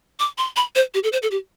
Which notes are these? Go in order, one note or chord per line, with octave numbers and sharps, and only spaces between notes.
D6
C6
B5
C5
G4
A4
C5
A4
G4